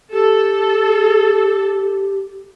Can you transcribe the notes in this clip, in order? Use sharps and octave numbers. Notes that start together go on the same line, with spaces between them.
G4 A4